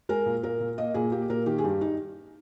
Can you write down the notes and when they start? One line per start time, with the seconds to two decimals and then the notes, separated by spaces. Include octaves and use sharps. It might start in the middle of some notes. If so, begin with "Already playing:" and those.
0.09 G#3 A#4
0.26 A#2
0.43 A#2 A#4
0.60 A#2
0.78 A#3 D#5
0.94 A#2 G#4
1.12 A#3 G4
1.29 A#2 A#4
1.46 D#3 G4
1.58 G#4
1.64 G2 G4
1.81 D#4